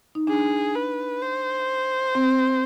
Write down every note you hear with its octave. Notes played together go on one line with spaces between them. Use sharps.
D#4
D4 G#4
B4
C5
C4